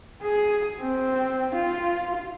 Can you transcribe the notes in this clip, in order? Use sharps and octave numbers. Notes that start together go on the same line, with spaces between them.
G#4
C4
F4